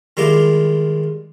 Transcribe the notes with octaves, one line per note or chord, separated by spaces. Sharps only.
D#3 G3 G#3 E4 F4 G4